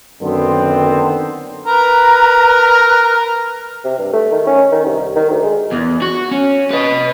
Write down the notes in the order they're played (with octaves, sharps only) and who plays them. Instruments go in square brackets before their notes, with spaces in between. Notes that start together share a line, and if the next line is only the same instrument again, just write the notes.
[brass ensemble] F#2 D3 D#3 B3 C4
[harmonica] A#4 B4 [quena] A#5
[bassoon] C3
G2
A3
D#3
C#4
D#3
C2
D#3
D2
G#3
[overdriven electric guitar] E2
F#4
C#4
B4 D#5